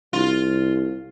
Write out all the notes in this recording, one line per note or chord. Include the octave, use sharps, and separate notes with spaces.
C2 F4